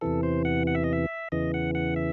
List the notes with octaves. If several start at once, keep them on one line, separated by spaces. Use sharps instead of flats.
E2 C3 E3 A4
C5
F#5
F#5
E5
D#5
E5
E2 C#3 E3 D#5
F#5
F#5
E5